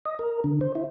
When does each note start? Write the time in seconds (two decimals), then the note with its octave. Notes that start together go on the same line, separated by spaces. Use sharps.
0.05 D#5
0.19 A#4
0.44 D3
0.61 C5
0.75 E4